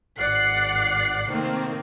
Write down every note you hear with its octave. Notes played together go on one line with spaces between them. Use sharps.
G#1 D5 F#5 F#6 C7
C3 D#3 A3 A#3 C4